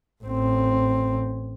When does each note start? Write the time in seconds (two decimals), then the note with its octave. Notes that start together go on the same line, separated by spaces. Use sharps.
0.24 A1 C4